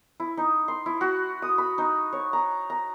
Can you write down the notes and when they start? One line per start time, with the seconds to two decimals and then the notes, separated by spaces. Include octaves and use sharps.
0.20 E4
0.37 D#4
0.68 C6
0.86 E4
1.01 F#4
1.42 D#6
1.58 B5
1.78 D#4
2.13 C#5
2.33 A#5
2.70 A#5